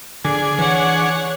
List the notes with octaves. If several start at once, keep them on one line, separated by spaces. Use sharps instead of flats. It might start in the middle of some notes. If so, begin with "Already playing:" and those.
D3 D4 G#4 G#5
E3 C#5 F#5